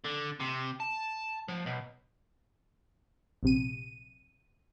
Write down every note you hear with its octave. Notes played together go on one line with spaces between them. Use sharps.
D3
C3
A5
F3
B1
A#1 C3 D#7